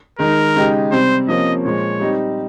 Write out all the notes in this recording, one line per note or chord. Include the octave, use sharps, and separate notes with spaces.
D#3 G#3 D#4 A#4
C#3 G#3 D#4 G4
C3 G3 C4 C5
C3 F3 A#3 C#4 D#5
A#2 F3 G#3 C#5
G3 C4 D#4 G4